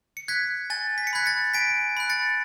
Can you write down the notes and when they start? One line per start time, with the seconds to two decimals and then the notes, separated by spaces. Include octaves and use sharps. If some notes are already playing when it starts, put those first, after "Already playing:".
0.17 C#7
0.28 F#6 G#6 B6
0.70 G#5 A6
0.98 B6
1.07 C#7
1.13 B5 F#6 G#6 B6
1.26 A6 C#7
1.54 G#5 B6 D7
1.97 B5 F#6
2.09 A6 C#7